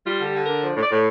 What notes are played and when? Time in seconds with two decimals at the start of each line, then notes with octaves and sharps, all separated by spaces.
0.06 G3 F4
0.20 D3
0.26 G4
0.34 D3
0.43 D4 A#4
0.63 F3
0.76 A2
0.82 D5
0.91 A2